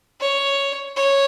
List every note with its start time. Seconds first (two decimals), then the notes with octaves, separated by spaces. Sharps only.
0.20 C#5
0.96 C#5